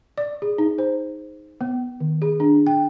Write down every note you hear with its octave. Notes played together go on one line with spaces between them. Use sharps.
D5
G#4
D#4
C5
B3
D#3
G#4
D4
G5